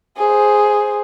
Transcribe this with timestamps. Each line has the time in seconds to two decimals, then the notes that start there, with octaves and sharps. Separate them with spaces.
0.17 G#4 C5